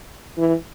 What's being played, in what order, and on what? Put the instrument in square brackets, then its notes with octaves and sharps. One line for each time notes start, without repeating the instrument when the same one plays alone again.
[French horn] E3